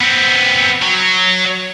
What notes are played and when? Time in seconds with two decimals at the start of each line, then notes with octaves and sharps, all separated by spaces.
0.01 B3 C4
0.82 F#3